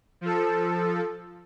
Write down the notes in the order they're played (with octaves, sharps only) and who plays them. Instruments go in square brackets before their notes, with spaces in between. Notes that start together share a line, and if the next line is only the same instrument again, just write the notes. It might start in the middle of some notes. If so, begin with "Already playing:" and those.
[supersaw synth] F3 A4